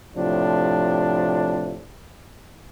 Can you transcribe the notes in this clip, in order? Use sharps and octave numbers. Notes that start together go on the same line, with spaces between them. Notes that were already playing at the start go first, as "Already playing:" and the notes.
A2 C3 F3 D4